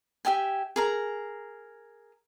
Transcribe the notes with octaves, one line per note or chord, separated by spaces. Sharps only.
G4 E5 G5 G#5
G#4 A#4 A#5